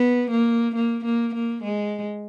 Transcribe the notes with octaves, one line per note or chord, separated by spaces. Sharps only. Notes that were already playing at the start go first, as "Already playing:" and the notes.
Already playing: B3
A#3
A#3
A#3
A#3
G#3